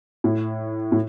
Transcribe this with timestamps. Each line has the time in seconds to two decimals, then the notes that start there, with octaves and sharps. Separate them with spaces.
0.24 A2
0.92 A2